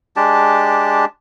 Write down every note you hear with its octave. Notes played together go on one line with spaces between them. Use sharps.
G#3 D4 G4 A5